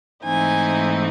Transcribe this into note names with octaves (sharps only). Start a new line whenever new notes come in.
G#2 E3 A3 C4 D#4 G#5